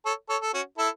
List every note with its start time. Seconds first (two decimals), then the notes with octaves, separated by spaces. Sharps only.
0.06 A4 C#5
0.29 A4 C#5
0.42 A4
0.54 C#4 F#4
0.78 E4 A4